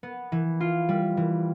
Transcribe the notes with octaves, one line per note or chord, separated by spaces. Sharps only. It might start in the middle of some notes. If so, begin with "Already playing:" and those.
B3
E3
F4
G3
E3